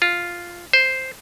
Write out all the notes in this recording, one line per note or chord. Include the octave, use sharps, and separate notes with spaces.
F4
C5